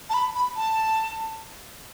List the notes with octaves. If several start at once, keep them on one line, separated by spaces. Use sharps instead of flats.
A5
B5
B5
A5